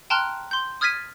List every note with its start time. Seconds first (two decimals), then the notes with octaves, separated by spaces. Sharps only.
0.10 G5 A5 A#5 C6 F6 F#6
0.51 C6 G6
0.81 D#6 F6 G#6 A6 B6 D#7